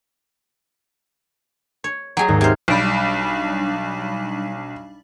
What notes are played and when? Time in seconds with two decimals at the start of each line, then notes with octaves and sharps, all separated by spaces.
1.84 C#5
2.17 F#3 G#4 G5 A#5
2.28 D#2 G#2
2.41 C3 C5 F6 G#6
2.68 B1 G3 D4 B5